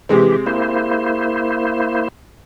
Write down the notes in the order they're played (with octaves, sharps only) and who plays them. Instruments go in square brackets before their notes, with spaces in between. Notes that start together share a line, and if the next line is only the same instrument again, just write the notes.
[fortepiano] C3 G#3 C4 [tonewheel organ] E3 G4
[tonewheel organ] A#3 E4 C5